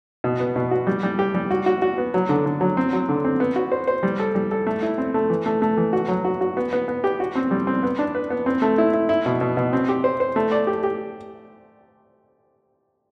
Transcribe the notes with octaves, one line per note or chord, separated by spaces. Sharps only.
B2
B3
B2
F#4
G3
G3
G4
G3
F#4
F#4
F#4
B3
F#3
D3
D3
F#3
C4
F#3
D3
C4
B3
F#4
C5
C5
G3
A4
G3
A4
A3
E4
C4
A3
E3
A3
A3
E3
F#4
F#3
F#4
F#4
B3
B3
B3
G4
F#4
C4
G3
C4
B3
D4
B4
B3
C4
A3
E4
E4
E4
B2
B2
B2
C4
G4
C5
C5
A3
D5
G4
G4